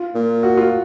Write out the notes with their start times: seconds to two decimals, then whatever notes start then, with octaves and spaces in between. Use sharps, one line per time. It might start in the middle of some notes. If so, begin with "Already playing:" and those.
Already playing: F4
0.15 A#2
0.43 F#4
0.57 F4